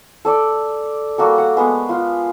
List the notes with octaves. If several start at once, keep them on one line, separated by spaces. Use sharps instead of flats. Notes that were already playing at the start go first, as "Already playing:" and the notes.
A4 D5
G3 A#3 F#4 A4
F#5
G#3 B3
F4